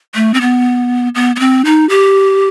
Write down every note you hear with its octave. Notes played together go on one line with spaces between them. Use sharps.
A3
C4
B3
B3
B3
C4
D#4
G4